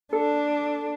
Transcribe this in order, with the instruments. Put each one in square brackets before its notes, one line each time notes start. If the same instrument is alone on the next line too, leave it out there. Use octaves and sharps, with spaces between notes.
[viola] D4 [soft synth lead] A4